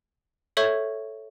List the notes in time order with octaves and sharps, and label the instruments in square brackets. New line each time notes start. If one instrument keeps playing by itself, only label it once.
[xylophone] A4 C#5 E5 C#6 G6 G#6